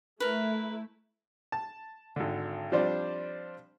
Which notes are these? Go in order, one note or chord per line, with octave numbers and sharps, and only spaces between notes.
A3 E4 A#4 B4
A5
G#1 D3
F3 G3 C4 D4 C5 D5